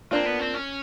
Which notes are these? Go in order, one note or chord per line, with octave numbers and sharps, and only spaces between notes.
A#3 C4 D4 F4
B3
C4
C#4